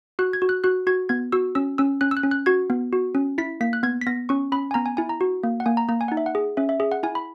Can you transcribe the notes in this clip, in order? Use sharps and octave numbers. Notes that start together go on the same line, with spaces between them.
F#4 F#6
G#6
F#4
F#6
F#4 F#6
F#4 G#6
B3 G#6
F#4 E6
C#4 E6
C#4 E6
C#4 F#6
E6
F#6
C#4
F#6
F#4 G#6
B3
F#4
C#4
E4 B6
A#3 B6
F#6
B3 G#6
B6
B3 A#6
C#4 C#6
C#4 B5
G#5
B3 A#5
G#5
E4 G#5
A#5
F#4
A#3
F#5
A#3 G#5
A#5
A#3 A#5
G#5
D#4 F#5
E5
F#5
G#4
C#4 E5
E5
G#4 E5
F#5
E4 G#5
B5